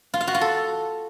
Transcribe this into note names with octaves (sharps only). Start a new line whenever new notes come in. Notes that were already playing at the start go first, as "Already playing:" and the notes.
F4
F5
F#4
F4
A4